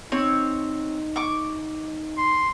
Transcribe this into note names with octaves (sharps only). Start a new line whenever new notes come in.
C4 D#4 C#5
C#6 D6
C6